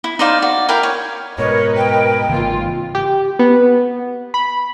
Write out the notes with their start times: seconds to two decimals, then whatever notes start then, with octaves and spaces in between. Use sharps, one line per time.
0.04 E4
0.19 D#4 C5 D5 F5
0.42 F#4 D5
0.69 E4 A#4 F5 G5
0.83 C#5
1.38 G#2 B2 A#4 B4 C#5 D#5
1.77 G5
2.29 G#1 C#3 E3 A#3 F4
2.95 G4
3.39 B3
4.34 B5